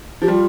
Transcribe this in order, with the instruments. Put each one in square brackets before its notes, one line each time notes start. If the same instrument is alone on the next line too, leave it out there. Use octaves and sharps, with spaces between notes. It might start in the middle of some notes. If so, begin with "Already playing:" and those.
[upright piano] F3 [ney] G4
[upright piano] G3 [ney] F4